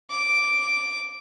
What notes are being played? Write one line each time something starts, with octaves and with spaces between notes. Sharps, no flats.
D6